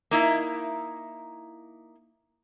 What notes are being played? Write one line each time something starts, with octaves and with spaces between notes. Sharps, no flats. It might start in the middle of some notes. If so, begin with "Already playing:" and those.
A#3 D#4 E4